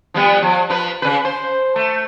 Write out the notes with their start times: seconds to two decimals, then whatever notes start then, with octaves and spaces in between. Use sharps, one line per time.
0.14 F3 G3 B3
0.42 F3
0.70 F3 B4
1.02 C#3 B4
1.25 C5
1.76 A3